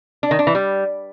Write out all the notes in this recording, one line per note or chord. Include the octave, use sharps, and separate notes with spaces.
D4
D#3
D4
E3
G3